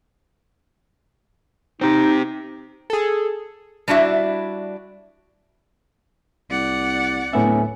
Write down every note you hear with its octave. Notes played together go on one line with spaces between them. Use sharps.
C4 D#4 G4
G#4 A4
G3 D4 E4 F#4 E5
C2 D5 F#5
D1 A2 B3 C#4 E5